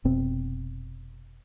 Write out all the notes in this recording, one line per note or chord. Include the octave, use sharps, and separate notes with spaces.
F1 B2 C4